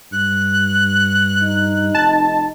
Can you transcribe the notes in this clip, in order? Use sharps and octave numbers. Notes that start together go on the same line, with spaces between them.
G2 F#6
D#4
F1 A5